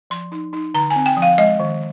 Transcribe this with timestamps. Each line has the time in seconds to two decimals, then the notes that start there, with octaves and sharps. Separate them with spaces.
0.10 F3 C6
0.32 D#4
0.53 D#4
0.74 D3 A#5
0.90 G#5
0.96 C4
1.06 G5
1.17 F3
1.22 F5
1.38 G#3 D#5
1.60 D#3